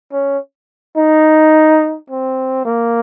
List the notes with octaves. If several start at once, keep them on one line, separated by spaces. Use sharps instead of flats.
C#4
D#4
C4
A#3